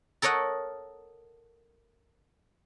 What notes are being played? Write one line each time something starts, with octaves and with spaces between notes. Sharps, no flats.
A4 A#4 C#5 D#5 F#5